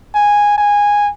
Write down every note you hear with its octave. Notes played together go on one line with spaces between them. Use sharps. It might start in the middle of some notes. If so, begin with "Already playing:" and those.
G#5
G#5